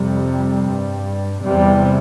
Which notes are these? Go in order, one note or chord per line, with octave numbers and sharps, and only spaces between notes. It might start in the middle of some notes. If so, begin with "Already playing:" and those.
Already playing: F2 C3 G3
G2
E2 C3 G3